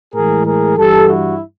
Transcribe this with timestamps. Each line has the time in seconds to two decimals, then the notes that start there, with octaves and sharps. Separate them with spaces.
0.14 A2 E3 G#3 G#4 A#4
0.45 G#4 A#4
0.77 G2 E3 G3 G4 A4
1.08 E4 F#4